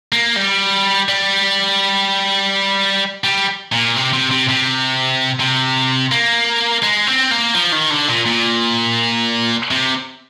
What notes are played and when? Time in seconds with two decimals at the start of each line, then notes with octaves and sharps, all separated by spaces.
0.12 A#3
0.36 G3
1.09 G3
3.24 G3
3.72 A#2
3.96 C3
4.13 C3
4.31 C3
4.49 C3
5.40 C3
6.11 A#3
6.83 G#3
7.07 C4
7.31 A#3
7.55 F3
7.73 D#3
7.91 D3
8.09 A#2
8.26 A#2
9.71 C3